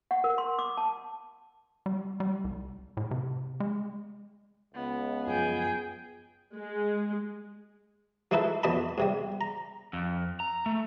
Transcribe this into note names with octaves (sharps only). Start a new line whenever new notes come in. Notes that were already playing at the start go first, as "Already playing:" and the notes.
F#5
A#4
C6
D6
A5
G3
G3
C2
A2
C3
G#3
C#2 B3
F#2 F3 G#4 G5
G#3
F3 G#3 D#4 E4 A4 B4
F2 B2 D5 D#5 A5 B5
G#2 C3 G3
A#5
F2
A#5
A3